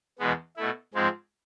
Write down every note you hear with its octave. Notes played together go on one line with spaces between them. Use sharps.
E2 B2 G#3 B3
B2 A3 E4
G#2 F3 G#3 C4